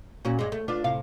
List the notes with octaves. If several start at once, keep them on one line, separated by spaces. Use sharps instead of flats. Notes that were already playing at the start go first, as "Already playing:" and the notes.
A#2 C#4 F#4
G2 G#3
A3
D4 F4 B4
A2 C3 F5